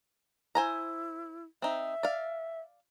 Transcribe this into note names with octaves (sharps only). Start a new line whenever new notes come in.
E4 C5 G#5 A#5
C4 D#4 E5
D5 F5